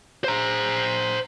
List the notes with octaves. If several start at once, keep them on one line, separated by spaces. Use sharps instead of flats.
C5 A#5